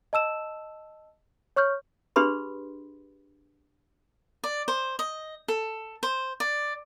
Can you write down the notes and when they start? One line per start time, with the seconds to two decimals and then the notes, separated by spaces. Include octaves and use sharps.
0.13 D#5 A5 E6 E7
1.56 C#5 C#6 F6 G6
2.16 D4 G4 G#4 B4 B5 C6
4.44 D5
4.68 C5
4.99 D#5
5.48 A4
6.03 C5
6.40 D5